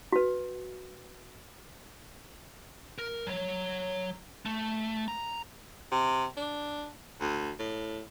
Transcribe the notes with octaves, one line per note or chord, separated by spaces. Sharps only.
F#4 B4
A#4
F#3 C#5
A3
A#5
C3
D4
D2
A2